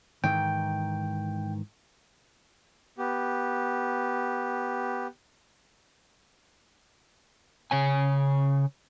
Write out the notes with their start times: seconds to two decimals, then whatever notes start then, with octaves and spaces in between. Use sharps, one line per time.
0.24 G#2 D#3 E3 G5
2.98 B3 G4
7.71 C#3 C#5 G#5